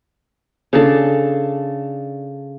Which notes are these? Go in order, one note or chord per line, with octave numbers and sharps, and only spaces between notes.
C#3 D4 A4